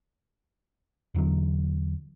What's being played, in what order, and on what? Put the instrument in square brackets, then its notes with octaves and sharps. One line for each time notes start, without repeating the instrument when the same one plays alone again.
[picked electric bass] E1 E2 D3 F#3